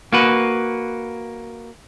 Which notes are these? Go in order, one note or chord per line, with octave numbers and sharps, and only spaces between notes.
A#3 F#4 B4